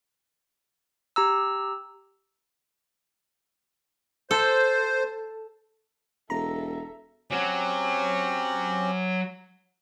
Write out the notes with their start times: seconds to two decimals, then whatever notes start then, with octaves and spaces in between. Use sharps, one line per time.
1.16 G4 A#5 E6
4.31 A4 C5
6.30 E1 A4 E5 A#5
7.31 F#3 C4 C#4 G4